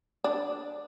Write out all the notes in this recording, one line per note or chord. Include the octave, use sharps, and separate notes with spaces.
D4